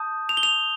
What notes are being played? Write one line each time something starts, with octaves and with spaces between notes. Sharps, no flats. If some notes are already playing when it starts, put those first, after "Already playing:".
Already playing: A5 D#6 G6
F7
G7
F7